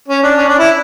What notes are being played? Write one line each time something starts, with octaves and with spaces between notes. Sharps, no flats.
C#4
D4
C#4
D4
E4